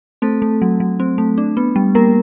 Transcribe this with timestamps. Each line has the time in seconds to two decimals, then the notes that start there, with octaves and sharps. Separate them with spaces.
0.22 A3 C4 A4
0.42 A3
0.62 F#3
0.80 F#3
1.00 C4
1.18 A3
1.38 D4
1.57 B3
1.76 G3
1.95 G3 A#3 A#4